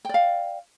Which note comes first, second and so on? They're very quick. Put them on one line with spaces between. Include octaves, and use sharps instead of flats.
G5 D5 F5